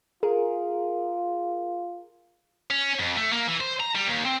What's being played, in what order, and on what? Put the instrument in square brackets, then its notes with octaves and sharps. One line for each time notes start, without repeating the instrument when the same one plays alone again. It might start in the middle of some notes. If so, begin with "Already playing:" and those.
[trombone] F4 [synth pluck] G#4 A#4
[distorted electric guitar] C#4
F2
A3
A#3
E3
C5
A#5
G3
D#2
C4